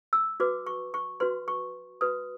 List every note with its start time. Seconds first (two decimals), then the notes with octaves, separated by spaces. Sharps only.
0.13 E6
0.40 F#4 B4 D6
0.66 C#6
0.94 C#6
1.20 F#4 B4 C6
1.48 C#6
2.01 F#4 B4 D#6